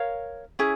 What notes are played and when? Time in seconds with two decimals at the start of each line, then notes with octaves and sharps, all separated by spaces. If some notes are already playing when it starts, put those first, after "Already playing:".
Already playing: A#4 C#5 F5
0.59 C#4 E4 G#4